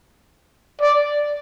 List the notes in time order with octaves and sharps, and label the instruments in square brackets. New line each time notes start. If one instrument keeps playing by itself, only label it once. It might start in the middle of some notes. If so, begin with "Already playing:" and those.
[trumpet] D5